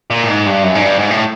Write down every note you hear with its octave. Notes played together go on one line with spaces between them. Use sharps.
A#2
A2
G#2
G2
F#2
G#2
G2
G#2
A2